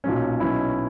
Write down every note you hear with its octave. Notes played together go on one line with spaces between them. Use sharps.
B1 A#2 F#3 C#4
B1 B2 F#3 C#4 E4